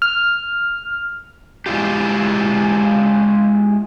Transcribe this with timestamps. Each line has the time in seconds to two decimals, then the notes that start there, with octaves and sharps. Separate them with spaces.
0.02 F6
1.66 G#3 E4 F4 G4